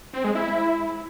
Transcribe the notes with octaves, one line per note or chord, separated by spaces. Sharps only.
C4
G#3
E4